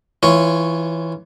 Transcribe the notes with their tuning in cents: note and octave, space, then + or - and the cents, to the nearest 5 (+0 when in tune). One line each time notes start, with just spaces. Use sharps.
E3 +0 F4 -20 C#5 +0